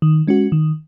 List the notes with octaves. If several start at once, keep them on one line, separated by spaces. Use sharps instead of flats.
D#3
G#3 C#4 F#4
D#3